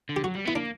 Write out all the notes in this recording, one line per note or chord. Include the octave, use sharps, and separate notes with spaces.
D3
G4
F#3 F#4
G3
B3 E4
A#3 D4